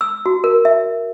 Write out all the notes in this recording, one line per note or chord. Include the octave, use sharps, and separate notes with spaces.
E6
F#4
A#4
E5